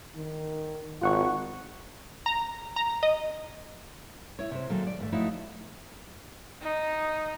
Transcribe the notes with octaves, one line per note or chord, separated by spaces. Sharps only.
D#3
G#1 F4 F#5 C#6
A#5
A#5
D#5
E4 C#5
C3 C5
A#2 D#3 F#3 G#3 A4
D5
D#2 G#2 G#3 A3
F3 A3 D#4 E4 F#4 C#5
D#4